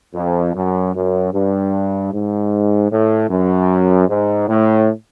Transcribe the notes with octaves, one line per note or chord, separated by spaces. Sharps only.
F2
F#2
F#2
G2
G#2
A2
F#2
G#2
A2